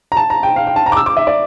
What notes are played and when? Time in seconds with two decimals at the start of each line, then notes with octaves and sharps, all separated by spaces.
0.12 A#5
0.17 A5
0.30 A#5
0.43 G5
0.56 F5
0.67 G5
0.76 A5
0.86 A#5
0.92 D6
0.97 E6
1.06 D6
1.17 E5
1.27 D5